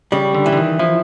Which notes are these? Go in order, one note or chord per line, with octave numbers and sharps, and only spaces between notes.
C#3 G3
D3
E3
D3
D#3
F3 E4